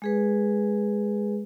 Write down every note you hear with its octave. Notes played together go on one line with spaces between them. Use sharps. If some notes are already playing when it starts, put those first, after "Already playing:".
G#3 G#4 B4